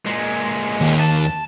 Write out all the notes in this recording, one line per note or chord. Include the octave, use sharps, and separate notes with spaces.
A#2 G#3
D#2
A5